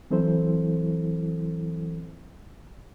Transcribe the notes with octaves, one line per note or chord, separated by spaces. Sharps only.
E3 F#3 C4 E4 A4 C5